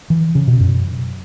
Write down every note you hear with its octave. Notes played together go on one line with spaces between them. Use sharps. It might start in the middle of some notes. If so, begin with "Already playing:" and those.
E3
C#3
B2
F#2